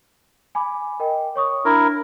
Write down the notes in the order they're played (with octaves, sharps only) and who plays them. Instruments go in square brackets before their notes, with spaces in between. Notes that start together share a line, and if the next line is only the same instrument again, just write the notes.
[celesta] G#5 B5 D6
A#4 D#5 G5
C#5 C#6 D#6
[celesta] D4 [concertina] E4 A#4